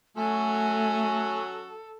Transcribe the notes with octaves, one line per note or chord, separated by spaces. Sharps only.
F#3 A3 C#4 F#4 A4 G#5